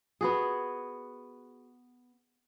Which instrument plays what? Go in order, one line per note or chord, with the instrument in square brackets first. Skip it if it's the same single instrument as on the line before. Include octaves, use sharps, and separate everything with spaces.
[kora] B3 F#4 G#4